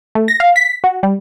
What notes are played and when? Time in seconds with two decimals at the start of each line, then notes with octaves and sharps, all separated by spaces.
0.15 A3
0.28 A#6
0.40 F5
0.56 B6
0.84 F#4
1.03 G3